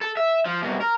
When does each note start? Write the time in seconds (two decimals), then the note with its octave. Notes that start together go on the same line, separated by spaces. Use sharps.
0.01 A4
0.17 E5
0.45 F3
0.62 C2 B2
0.81 A#4